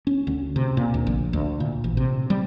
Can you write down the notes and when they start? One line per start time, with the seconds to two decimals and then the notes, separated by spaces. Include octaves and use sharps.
0.07 C#4
0.27 D2
0.56 C3
0.77 A#2
0.94 D2
1.07 A#1
1.33 D2
1.60 A#2
1.84 A1
1.97 C3
2.30 G3